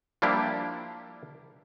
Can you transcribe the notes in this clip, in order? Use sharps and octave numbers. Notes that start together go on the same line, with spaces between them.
F3 G3 A#3 D4 E4 G4